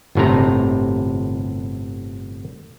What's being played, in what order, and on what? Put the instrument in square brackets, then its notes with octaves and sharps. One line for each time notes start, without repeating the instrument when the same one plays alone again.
[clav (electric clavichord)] G1 A2 C3 A#5